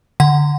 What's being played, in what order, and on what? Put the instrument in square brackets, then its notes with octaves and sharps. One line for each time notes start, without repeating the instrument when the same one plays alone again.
[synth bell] D3 F#5